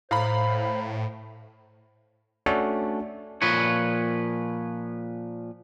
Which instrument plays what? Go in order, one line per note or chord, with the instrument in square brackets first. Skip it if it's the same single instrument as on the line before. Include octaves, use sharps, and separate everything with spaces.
[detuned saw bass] A2 [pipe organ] C5 [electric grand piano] F5 A#5 B5
[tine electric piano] A3 C#4 D4 F#4
[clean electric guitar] A#2 F3 B4 C#5